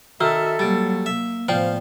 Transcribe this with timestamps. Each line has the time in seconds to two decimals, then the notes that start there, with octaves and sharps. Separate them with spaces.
0.21 D#3 F#4 A4 E5 E6 F6
0.59 F#3 G3 A#3 A6 D7
1.06 A#3 E5
1.48 A2 F3 B3 F4 C5 D5 F5 G5